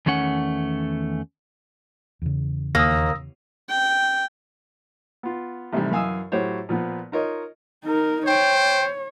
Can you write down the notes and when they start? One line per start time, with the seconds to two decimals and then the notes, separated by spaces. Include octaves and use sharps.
0.06 E2 D#3 A3 C#4 F#5
2.22 E2 C#3
2.75 D#2 A#3 D#6 E6 A#6
3.69 G5
5.23 B3 F4
5.73 A1 C3 D#3 G3
5.91 F#2 E3 F5 G#5 D#6 E6
6.32 A2 F#3 G4 C5 C#5
6.69 A#2 F3 B3
7.12 D#4 F4 A#4 C#5 D#5
7.84 D#4 A#4
8.27 C5 C#5 G5